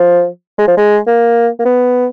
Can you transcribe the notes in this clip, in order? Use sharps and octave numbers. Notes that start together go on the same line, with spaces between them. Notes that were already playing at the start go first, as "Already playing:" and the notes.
Already playing: F3
G#3
F3
G#3
A#3
A#3
B3